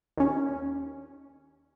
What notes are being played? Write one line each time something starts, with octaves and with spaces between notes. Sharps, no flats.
D#2 C#4